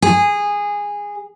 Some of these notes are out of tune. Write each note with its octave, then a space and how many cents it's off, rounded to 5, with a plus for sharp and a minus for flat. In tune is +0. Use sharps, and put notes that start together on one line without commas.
G#4 -15